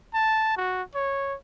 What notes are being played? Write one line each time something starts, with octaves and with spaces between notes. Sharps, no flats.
A5
F#4
C#5